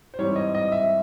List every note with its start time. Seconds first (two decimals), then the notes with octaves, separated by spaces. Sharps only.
0.14 C5
0.19 G#2 E3 G3 C4 C#5
0.36 D#5
0.55 D#5
0.72 E5